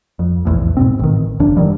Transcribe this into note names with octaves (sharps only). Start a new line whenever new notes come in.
F2
F1 B1 E2 A2
G#2 B2 C4
A1 D#3
G1 F#2 C#3 D4
D#3 E3 F#3 G3